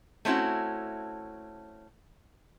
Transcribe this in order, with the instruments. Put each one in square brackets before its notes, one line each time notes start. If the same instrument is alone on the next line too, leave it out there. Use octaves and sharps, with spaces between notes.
[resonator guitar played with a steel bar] A3 C4 C#4 E4 F#4